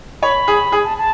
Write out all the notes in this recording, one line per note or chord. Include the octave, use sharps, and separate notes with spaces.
C#5 B5
G#4
G#4
A5
A5